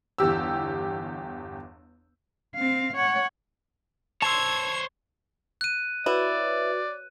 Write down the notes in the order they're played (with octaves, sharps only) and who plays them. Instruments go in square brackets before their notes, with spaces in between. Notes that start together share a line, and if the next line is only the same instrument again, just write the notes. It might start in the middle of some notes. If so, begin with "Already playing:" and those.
[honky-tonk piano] G1 E2 G4 E6
[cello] C4 F5
C#5 F#5
[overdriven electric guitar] C5 C#5 [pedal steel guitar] A5 C6 E6 [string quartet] G#6
[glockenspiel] F#6 D#7
[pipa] E4 [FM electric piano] F#4 B4 C#5 [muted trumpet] D5